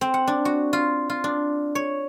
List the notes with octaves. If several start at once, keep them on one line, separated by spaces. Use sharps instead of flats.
C4
F#5
D4
F#4
F4
F4
D4
C#5